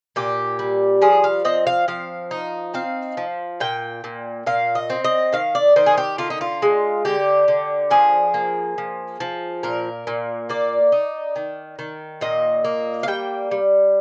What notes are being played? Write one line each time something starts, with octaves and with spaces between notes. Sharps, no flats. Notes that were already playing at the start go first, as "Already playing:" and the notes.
A#2 G4
G3
F3 G#4
F5
C4 D#5
F5
F3 F5
D#4
C4 F5
F3
A#2 G5
A#2
A#2 F5
D#5
C4
D#5
D#3 F5
D5
D#3 C5
G#4
G4
D3 F4
D#4
F4
G#3
D3 G4
D3
F3 G#4
A#3
F3
F3
A#2 A#4
A#2
A#3 D5
D#4
D#3
D#3
A#2 D#5
A#3
F5
G3 G5
G3